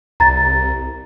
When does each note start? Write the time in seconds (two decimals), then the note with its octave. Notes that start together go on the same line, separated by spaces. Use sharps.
0.20 C2 A#5 A6